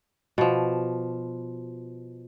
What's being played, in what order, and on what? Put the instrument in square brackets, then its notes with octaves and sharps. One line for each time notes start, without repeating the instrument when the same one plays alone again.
[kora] B2 F3